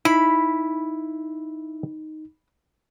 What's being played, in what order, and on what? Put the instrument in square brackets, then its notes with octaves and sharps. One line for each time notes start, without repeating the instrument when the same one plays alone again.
[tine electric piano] D#4 [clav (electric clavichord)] E4 [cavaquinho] B5